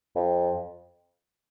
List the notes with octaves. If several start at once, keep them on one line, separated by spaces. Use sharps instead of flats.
F2